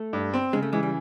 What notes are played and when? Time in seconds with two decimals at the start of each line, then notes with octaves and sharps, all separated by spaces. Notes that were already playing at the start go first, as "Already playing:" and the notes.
Already playing: A3
0.13 G2
0.34 C4
0.53 C#3 G#3
0.63 A3
0.73 E3 G#3
0.83 G3